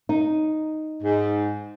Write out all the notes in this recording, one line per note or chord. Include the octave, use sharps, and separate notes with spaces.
D#4
G#2